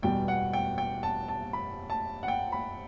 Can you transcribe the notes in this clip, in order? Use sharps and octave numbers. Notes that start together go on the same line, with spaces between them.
E2 B2 G3 G5
F#5
G5
G5
A5
A5
B5
A5
F#5
G5
B5